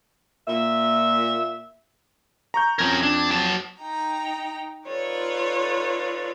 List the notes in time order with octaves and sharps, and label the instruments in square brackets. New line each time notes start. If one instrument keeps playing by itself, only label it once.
[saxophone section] A#2 E5
[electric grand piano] A#5 C#6 G6
[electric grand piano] F2 G#6 [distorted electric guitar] C#4 A#4
[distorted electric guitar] D4
F#3 A5
[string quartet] D#4 G5 A#5
D#4 F4 A4 B4 C#5 D5